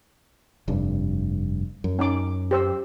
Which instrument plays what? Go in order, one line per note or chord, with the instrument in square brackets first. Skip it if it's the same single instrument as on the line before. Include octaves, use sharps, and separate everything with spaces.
[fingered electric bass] F1 G2
F#2
[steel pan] C#4 D#4 D6
G4 C5 E6